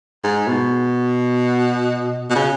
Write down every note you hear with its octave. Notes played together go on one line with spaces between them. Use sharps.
G#2
B2
B2
C#3